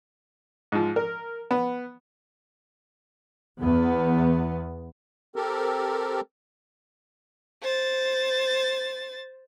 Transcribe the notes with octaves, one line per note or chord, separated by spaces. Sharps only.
G#2 F3
A#4
B3
E2 B3
C4 G4 A4 A#4
C5 A6